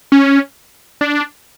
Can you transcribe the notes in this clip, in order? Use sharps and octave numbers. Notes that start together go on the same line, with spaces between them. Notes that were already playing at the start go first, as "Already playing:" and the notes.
C#4
D4